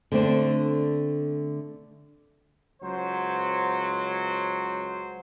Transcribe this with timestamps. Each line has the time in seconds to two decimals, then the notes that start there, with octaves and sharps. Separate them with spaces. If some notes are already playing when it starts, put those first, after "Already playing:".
0.12 D3 A3 C4 D4
2.82 C#2 F#3 C5